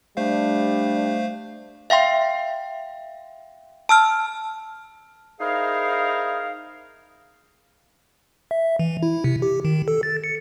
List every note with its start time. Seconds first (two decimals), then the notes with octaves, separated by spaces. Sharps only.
0.17 G3 A3 D4 C5 F5
1.90 E5 F5 G5 C6
3.89 A5 E6 F6
5.40 D#4 E4 G#4 A#4 C5 F5
8.51 E5
8.79 E3
9.03 E4
9.24 C3
9.42 G4
9.65 D#3
9.88 A4
10.03 A6
10.24 C#7